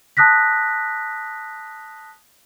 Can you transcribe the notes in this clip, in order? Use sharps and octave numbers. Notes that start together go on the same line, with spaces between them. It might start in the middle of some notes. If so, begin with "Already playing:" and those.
A5 D#6 F#6 A#6 B6